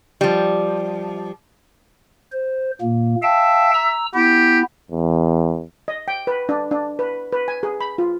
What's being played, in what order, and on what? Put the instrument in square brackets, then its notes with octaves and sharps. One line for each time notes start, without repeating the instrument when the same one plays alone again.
[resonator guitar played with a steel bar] F3 G3
[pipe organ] C5
A#2 A#3
[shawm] E5 [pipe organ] F5 G5 A5
[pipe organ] A#5 E6
[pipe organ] B3 E4 [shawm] G4
[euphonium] E2
[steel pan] D#5
G5
B4
D4
D4
B4
B4
G#5
G#4
B5
F4